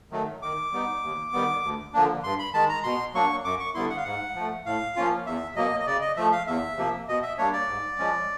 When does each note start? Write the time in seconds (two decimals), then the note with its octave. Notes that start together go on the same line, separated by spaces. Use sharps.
0.11 D#3 F#3 A3
0.42 D#3 D6
0.72 G3 B3 D#4
1.02 D#2
1.33 D#3 G3 B3
1.63 D2
1.93 D3 F3 A#3 D4
2.24 G2 C6
2.39 B5
2.54 D#3 G#3 A5
2.69 A#5
2.84 B2 C6
3.14 F#3 A#3 D4 C#6
3.44 F#2 D6
3.59 C#6
3.74 D3 G3 B3 E4 C6
3.90 F#5
3.97 F5
4.04 G#2 F#5
4.35 F3 A3
4.65 A2 F5
4.96 F3 A#3 C#4 F4
5.26 E2 E5
5.56 B2 F#3 A#3 D#5
5.80 D#5
5.86 C#3 D5
6.01 D#5
6.16 F3 A3 E5
6.32 F5
6.47 E2 E5
6.77 C3 F3 A#3
7.08 B2 D#5
7.23 E5
7.38 G3 A#3 D4 C#5
7.53 D5
7.68 G#2
7.99 F3 G#3 C#4